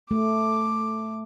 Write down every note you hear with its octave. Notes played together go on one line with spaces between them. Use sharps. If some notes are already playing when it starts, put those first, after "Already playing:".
A3 D6